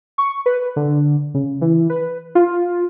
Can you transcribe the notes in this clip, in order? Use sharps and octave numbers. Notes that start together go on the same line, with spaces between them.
C#6
B4
D3
C#3
E3
B4
F4